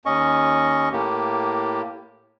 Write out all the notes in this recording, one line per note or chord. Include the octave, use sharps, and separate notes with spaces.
D#2 C#4 D#5 C#6
A2 A#3 G4